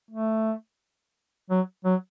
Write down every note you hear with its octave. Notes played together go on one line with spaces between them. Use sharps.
A3
F#3
F#3